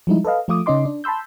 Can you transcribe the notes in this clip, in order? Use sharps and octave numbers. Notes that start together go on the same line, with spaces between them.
F3 G3 G#3 D#4 E4
A4 B4 D#5 F5
F3 A3 F4 D6 D#6
C#3 C#4 D#4 D#5 C6 D6
D4
A5 B5 C6 E6 G6